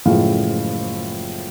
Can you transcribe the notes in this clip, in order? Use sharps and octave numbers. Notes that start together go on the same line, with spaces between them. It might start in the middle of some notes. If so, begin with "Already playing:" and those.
F#1 A2 F3 G#3 F5